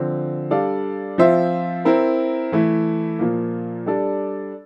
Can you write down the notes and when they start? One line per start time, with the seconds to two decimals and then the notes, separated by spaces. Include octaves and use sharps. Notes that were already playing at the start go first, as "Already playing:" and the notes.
Already playing: D3 F3 C4
0.51 G3 D4 A4 D5 F5
1.18 F3 C4 F4 C5 E5
1.85 C4 E4 A#4
2.52 E3 A3 E4
3.19 A#2 F3 A#3
3.86 G3 D4 A4 D5